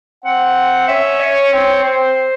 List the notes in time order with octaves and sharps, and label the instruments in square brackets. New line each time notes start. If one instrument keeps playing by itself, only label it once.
[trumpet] C4 [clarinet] F#5
[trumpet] C#4 [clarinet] E5
[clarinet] C#5
[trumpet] C4
[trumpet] C4 [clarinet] C5